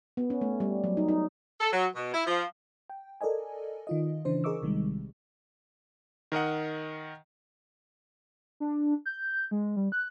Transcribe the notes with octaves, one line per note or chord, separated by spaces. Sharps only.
B3
C#4
A3
G3
F#3
D#4
D#4
A4
F#3
B2
E4
F3
G5
A4 A#4 D5 D#5 G#5
D#3 F4 D#5
C#3 E3 D4 C5
G#4 A#4 D#5 C#6 D6 E6
A#1 C3 D#3 G3 G#3
D#3 A#4 D#5 F#5
D4
G6
G#3
G3
F#6